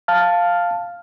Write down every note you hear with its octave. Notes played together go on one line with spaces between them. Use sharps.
F5 A5 F6